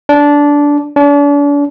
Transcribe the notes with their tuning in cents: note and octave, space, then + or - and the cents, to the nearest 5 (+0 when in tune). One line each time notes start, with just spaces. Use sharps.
D4 -15
D4 -40